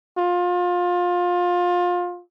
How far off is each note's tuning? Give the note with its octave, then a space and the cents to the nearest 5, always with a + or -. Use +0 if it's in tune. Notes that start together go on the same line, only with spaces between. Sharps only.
F4 +25